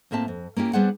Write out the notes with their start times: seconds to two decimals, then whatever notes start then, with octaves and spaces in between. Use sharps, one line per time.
0.11 A2 A#3 C4 E5 A5
0.28 F2
0.57 A#3 C#4 E4 G4
0.73 G3 B3 D4 G#4 C5 F#5